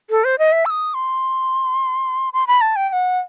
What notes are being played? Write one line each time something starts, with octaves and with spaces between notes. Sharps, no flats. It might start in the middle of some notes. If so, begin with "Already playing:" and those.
A4
C5
D#5
E5
E6
D#6
C6
C6
B5
A5
G5
G5
F#5